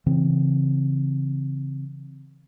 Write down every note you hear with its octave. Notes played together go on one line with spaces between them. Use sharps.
C#3 E3 C4